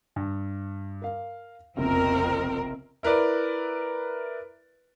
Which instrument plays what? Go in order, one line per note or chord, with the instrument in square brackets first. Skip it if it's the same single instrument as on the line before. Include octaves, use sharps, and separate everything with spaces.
[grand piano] G2
A#4 F5
[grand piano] F#1 B1 C3 [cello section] F2 C4 A#4
[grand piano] E4 A#4 B4 D5